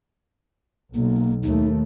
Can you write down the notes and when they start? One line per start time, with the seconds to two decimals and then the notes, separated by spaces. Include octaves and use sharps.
0.94 B1 A#3
1.43 D#2 A3 D#4